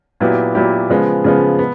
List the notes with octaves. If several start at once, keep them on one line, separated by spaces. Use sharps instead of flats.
A#2 F#3 B3 E4 G4
A#2 F#3 B3 E4 G4
C#3 F3 G#3 B3
C#3 F3 G#3 B3
B3